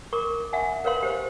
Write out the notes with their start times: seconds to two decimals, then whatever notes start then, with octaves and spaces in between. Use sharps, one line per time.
0.13 A#4 C#6 D6
0.53 E5 F#5 G#5
0.84 A#4 B4 C#5 F5 C6
1.03 G4 C5